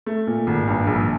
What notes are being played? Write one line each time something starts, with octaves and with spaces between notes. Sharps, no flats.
A3
A#2
G#1
G2
A#1